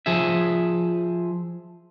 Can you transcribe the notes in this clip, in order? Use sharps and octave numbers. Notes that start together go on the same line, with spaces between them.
F3 G#4 E5